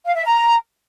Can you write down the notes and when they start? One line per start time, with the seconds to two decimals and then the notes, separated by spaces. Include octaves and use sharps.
0.05 F5
0.15 E5
0.24 A#5